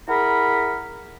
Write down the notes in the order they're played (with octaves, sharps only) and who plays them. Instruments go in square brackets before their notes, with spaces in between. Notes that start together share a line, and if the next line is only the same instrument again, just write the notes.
[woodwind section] E4 G#4 A#4 F#5 A#5 B5